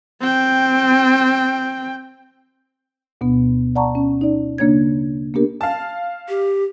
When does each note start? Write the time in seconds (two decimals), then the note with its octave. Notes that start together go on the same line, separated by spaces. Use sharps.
0.20 C4 G5
3.21 D2 B2 B3
3.75 D5 F#5 A5 A#5 C#6
3.95 C#4
4.21 D#4 D5
4.58 C#3 A#3 D4 C#5 G#6
5.34 A#3 B3 D4 G4 A#4
5.61 F5 A5
6.29 G4